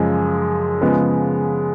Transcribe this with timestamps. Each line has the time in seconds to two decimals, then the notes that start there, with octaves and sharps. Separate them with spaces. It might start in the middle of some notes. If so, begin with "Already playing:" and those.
Already playing: F#2 C#3 F3 G#3
0.81 C#3 F3 G#3 B3